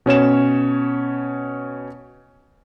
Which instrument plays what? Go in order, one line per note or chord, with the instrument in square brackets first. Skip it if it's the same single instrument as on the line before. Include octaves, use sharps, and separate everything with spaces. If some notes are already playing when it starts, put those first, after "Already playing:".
[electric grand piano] B2 C#4 C#5 E7